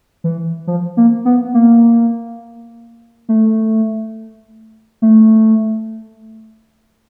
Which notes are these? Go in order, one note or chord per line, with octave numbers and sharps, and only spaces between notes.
E3
F3
A#3
B3
A#3
A3
A3